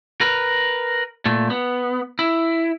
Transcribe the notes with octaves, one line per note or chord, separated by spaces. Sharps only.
A#4 B4
A#2 A3
B3
E4